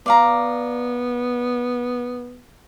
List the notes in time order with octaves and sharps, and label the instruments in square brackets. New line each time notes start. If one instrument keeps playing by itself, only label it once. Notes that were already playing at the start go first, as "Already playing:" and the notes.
[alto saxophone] B3 [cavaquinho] D5 F5 A#5